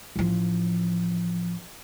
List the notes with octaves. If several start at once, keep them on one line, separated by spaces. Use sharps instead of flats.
A1 F3